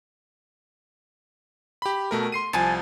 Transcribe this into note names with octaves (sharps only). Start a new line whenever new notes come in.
G4 B5
B2 A3 A#4
C6 C7 D#7
C2 F3 G#5 A5